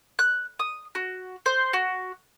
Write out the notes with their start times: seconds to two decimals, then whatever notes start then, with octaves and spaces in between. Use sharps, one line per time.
0.19 F#6
0.59 D#6
0.95 F#4
1.46 C5
1.73 F#4